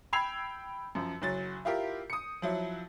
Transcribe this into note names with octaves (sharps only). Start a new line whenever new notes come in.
G5 B5 E6 G#6 C7 F7
F#2 F3
F#1 F#3 A6
E4 F4 G4 A#4
D#6 C#7
F3 F#3 E4